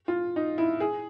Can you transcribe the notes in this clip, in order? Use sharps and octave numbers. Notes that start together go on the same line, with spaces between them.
F4
D#4
E4
G#4